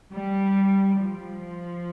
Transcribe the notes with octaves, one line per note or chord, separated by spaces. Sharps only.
G3
F3